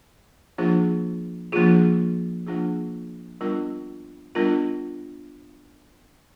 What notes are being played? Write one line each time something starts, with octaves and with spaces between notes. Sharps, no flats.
F3 A#3 D4 F4 G#4
F3 A#3 D4 F4 G#4
F3 A#3 D4 F4 G#4
G3 B3 D4 F4 A#4
G3 B3 D4 F4 A#4